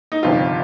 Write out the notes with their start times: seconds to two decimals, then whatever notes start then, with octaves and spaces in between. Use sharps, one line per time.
0.12 D#4
0.23 G1 F2 C3 D#3 F4